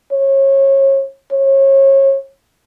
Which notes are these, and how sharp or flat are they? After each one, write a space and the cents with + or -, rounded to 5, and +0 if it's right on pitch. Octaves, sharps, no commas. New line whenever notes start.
C#5 -30
C#5 -30